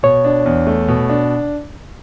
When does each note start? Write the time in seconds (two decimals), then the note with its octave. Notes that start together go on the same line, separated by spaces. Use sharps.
0.03 B2 C#5
0.25 D4
0.46 E2
0.67 A3
0.88 B2
1.09 D4